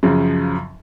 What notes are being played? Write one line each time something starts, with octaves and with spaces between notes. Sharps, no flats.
F#2 C#3 F3